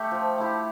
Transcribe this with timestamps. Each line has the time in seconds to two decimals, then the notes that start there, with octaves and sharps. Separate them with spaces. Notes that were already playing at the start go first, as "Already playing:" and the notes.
Already playing: A3 G4
0.11 F3
0.38 A3 E4 G4